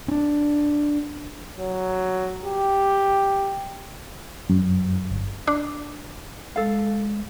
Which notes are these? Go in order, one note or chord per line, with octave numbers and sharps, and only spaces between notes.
C#4 D4
F#3
G4
F#2
G1
D4
G#3 A4 F5